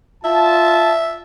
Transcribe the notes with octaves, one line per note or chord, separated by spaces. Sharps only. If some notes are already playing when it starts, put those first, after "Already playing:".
F4 E5 A5